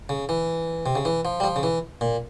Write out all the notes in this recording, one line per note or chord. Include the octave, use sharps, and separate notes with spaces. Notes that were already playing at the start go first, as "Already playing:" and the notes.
C#3
E3
C3
C#3
E3
F3
G3
F3
C#3
E3
A#2